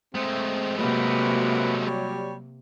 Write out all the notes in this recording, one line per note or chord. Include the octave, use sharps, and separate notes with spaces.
G#3 A3 C4
C3 F#3 A#3 F#4 B4
G3 C#5